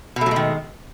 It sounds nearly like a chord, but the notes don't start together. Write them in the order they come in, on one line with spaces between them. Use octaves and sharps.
B2 A3 F#3 G#3 D#3